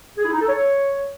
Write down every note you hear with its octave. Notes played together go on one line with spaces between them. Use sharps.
G#4
E4
D#4
A4
C#5